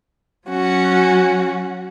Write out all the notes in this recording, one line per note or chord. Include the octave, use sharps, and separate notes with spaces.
F#3 C#4 F#4